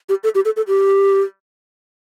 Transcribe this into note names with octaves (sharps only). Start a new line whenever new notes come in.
G4
A4
G4
A4
A4
G4